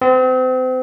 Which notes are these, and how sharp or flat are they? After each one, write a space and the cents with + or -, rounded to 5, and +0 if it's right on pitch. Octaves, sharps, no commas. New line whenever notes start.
C4 -35